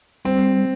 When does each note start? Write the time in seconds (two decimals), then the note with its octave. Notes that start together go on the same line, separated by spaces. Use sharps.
0.25 G3 C4